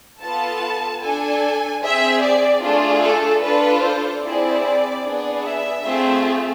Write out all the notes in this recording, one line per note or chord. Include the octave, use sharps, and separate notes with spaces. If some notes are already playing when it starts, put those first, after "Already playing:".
B3 F4 A4 A5
D4 A4 G#5
C4 G#4 E5
D5
A3 D4 F4 G#4
A4
D4 F4 A4 B4
C5
C4 E4 G#4 D5
B3 D4 G#4
E5
A3 C4 F4 G#4